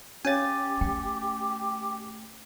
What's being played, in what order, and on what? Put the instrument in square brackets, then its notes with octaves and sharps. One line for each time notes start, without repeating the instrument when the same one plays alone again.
[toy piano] C#4 C#5 F5 [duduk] G4 [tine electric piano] G#5 A6
[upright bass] A3 [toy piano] G5